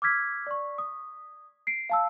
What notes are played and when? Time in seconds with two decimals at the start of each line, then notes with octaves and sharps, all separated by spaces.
0.02 D6 E6 F6 G#6 B6
0.47 D5 C#6
0.78 D#6
1.67 C7 D7
1.90 F5 A5 E6